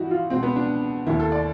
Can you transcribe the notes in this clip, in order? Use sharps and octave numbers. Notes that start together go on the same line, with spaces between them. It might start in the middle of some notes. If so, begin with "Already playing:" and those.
Already playing: G2 E3 D#4 E4 F#4
F4
C#2 B2 C4
B3
D4
D#2 D#3 E4
A4
D5